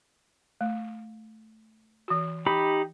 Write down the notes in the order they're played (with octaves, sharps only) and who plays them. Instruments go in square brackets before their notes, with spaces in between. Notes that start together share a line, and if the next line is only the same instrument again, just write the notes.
[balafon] A3
E3 F#4
[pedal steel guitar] D#4 G4 B5